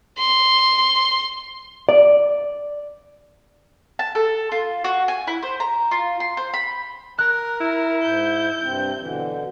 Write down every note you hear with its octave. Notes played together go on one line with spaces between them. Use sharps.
C6
D5
A5
A4
F4
F#4
G#5
E4
C5
A#5
F4
C6
C5
B5
A#4 F#6
E4
G#2 G6
G2 C3 C4
B2 D3 E3